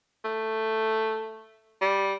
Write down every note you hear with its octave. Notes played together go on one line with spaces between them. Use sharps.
A3
G3